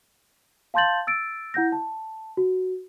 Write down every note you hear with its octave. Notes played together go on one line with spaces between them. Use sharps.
F5 A5 C6 G6 A6 F#7
E6 A6 D7
E4 F#5 G6 A#6
A5
F#4